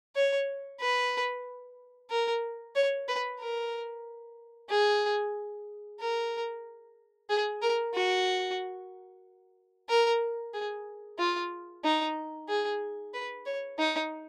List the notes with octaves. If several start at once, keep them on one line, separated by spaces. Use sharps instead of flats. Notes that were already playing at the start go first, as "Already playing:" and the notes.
C#5
B4
A#4
C#5
B4
A#4
G#4
A#4
G#4
A#4
F#4
A#4
G#4
F4
D#4
G#4
B4
C#5
D#4